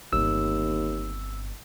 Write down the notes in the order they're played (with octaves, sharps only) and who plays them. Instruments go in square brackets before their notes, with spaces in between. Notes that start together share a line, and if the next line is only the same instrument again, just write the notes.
[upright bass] G1 C4 [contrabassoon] D#2 [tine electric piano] E6